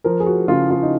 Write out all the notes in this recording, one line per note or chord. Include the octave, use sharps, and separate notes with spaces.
F3 A#4
G#4
F#4
C#3 F4
F4
D#4